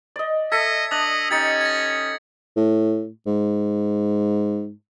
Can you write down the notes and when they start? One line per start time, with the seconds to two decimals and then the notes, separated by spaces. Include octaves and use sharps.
0.16 D5 D#5
0.52 A4 D#5 E5 G#6 B6 C#7
0.91 D4 D#5 D#6 F#7
1.31 C#4 D#4 G4 G#6 A6 C#7
1.61 G#6 A#6
2.57 A2
3.26 G#2